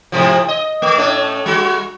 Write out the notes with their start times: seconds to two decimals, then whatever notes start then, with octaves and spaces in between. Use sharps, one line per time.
0.12 G#2 C3 F3
0.49 D#5
0.82 A3
0.98 A2 A3 C#4
1.46 G3 F#4